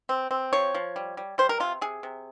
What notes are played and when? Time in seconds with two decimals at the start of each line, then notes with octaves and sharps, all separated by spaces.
0.09 C4
0.31 C4
0.53 F3 C#5
0.74 F3
0.96 G3
1.17 G3
1.38 G3 C5
1.49 A#4
1.60 C3 F4
1.81 C3 G#4
2.03 C3